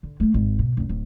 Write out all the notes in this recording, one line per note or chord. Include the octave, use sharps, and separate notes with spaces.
D3
A3 A#3
G#1 G#3
B2
F1 C#3
D1